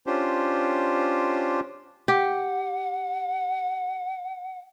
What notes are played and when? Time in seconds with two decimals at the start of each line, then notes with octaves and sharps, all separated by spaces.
0.07 C#4 D4 F4 G4 C5
2.08 G4 F#5